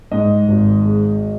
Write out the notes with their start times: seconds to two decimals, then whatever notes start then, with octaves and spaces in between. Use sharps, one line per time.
0.11 G#2 D#5
0.48 G#1
0.85 G#3